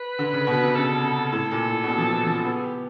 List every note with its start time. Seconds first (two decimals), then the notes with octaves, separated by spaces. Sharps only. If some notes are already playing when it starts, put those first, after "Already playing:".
Already playing: B4
0.19 D3
0.33 C#3
0.47 B2
0.62 C3
0.76 C#3 A4
1.04 C3
1.32 A2 A4
1.51 A#2
1.70 A2
1.84 B2
1.88 A#2
1.98 F3
2.07 E3
2.26 F3
2.44 B3 A4
2.55 G#4
2.65 G4